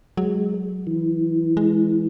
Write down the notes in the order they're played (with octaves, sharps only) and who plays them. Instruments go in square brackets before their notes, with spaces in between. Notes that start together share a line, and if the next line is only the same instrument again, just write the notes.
[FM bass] F#3 [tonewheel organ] G#3
[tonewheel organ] E3
[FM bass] G#3